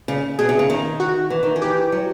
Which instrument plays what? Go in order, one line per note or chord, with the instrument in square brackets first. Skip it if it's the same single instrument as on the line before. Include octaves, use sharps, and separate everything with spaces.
[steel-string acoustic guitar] C#3
[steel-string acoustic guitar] B2 [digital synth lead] G#4
[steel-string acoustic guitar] C3
C#3
D#3
[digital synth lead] F#4
[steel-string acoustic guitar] E3
D#3
E3
[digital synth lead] G4
[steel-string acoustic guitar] F#3